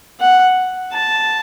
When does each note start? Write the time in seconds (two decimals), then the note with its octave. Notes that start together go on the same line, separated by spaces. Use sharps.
0.20 F#5
0.93 A5